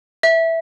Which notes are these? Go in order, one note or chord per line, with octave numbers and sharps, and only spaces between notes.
E5